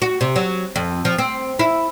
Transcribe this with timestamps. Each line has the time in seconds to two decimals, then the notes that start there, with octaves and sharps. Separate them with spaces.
0.02 F#4
0.21 C3
0.36 F#3
0.76 F2
1.05 F3
1.18 C4
1.59 E4